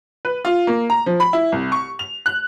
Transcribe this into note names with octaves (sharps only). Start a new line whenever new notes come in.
B4
F4
A#3
A#5
F3
B5
E4
C2
C#6
F7
F#6